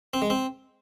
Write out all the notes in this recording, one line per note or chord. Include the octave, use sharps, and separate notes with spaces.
C4
G#3
C4